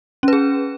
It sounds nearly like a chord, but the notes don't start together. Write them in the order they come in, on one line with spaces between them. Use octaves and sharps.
C#4 B4 G#4